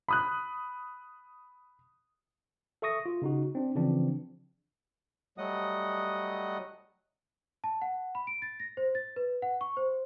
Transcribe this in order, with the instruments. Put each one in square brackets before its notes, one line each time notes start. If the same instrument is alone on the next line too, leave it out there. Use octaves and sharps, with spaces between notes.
[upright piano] B5 D#6 F#6
[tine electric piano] A4 E5 C#6 D#6 A#6
F4
C#3 D#4 F#4
C4 D4
C#3 E3 F3 C4 D4
[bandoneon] F#3 G3 A3 D#5 F#5 D#6
[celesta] A5
F#5
B5
D7
A6
A#6
C5
A6
B4
F#5
C#6
C5